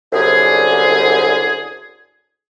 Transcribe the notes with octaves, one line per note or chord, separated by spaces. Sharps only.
C2 F#2 D3 G#4